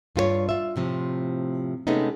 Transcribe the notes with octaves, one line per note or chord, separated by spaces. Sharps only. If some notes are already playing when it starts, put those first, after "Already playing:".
G2 F4 A4 C#5
F4 E5
A2 C3 F3
C3 G#3 A3 B3 C#4 D#4